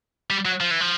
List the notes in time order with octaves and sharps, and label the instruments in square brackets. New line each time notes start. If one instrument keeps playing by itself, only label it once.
[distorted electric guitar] G3
F#3
F3
E3
F3